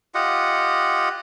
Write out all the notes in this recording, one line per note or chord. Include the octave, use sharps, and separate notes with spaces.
F4 G4 D#5 F#5